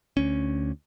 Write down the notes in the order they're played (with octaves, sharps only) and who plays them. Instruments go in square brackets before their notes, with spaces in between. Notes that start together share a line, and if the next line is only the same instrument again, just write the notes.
[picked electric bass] D2 C#4